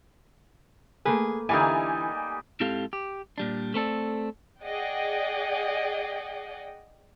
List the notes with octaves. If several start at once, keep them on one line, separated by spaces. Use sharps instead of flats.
A3 A#3 G#4 B4
D3 E3 G3 A#3 D#4 E4 D#5 G#5
G#2 C4 E4 G4 A4 F5
G4
A#2 G3 D4
A3 C4 A4 D5
G#4 D5 D#5 F#5 G5